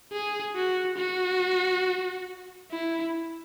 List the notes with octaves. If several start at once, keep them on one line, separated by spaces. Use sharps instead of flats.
G#4
F#4
F#4
E4